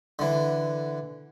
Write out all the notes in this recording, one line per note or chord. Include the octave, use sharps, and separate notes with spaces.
D3 E3